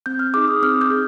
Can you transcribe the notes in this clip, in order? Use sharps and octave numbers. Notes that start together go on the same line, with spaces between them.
C4 G6
F6
D#4 G#4 D6
D#6
C4 F6
G6
D#4 G#4